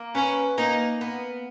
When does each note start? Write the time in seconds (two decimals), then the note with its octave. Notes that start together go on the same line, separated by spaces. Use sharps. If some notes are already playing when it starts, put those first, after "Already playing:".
Already playing: A#3
0.15 C#4 B4
0.58 A#3 D#4
1.01 B3